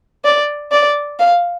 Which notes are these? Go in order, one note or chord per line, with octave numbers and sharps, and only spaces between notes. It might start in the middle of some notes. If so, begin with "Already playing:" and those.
D5
D5
F5